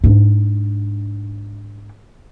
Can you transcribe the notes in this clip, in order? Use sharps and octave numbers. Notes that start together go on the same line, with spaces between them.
G#2 D4